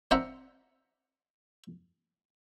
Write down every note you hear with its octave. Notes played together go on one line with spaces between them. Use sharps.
C4 D4 C5 E5 F#5 A#5